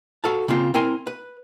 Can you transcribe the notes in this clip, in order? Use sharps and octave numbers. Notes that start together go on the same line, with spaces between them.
F#4 A4 F5 A5
C#3 A#3 C4 F4
C4 E4 A#4 G#5 C6
B4